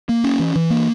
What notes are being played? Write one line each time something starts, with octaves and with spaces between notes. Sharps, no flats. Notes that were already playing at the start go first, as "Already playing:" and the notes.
A#3
C#4
E3
E3
A#3